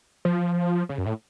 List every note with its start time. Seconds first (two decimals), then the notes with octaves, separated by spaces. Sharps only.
0.25 F3
0.89 C#3
0.98 F#2
1.06 A2